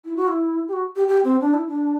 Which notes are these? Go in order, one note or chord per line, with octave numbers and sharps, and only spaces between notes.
E4
F#4
E4
G4
F#4
G4
G4
C4
D4
E4
D4